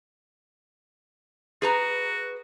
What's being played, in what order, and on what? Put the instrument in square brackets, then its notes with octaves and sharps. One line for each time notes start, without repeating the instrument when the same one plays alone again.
[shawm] F#4 [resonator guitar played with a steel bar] G#4 B4 A#5